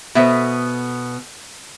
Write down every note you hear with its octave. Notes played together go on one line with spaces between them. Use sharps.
B2 B3 A4 C5 E5